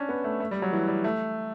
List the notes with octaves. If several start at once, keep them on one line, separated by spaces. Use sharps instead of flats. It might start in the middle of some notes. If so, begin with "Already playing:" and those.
Already playing: C#4 D4
B3
A3
A3
G3
F#3
E3
G3
A3